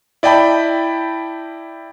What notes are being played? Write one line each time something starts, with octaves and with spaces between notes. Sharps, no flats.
E4 D5 D#5 G5 A5 B5